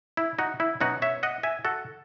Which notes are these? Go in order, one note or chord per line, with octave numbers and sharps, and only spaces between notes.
E4
D#4 F#4
E4
B2 F#3 C#4 D#4 F#4
C#5 E5
D#5 F#5
E5 G#5
F#4 A4